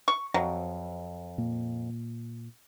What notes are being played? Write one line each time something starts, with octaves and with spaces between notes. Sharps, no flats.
C#6
F2 F#3
A#2 A#3